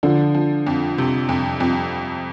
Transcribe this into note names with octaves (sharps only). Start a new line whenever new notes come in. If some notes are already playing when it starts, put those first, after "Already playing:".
D3 F3
F3
F2
C3
F2
F2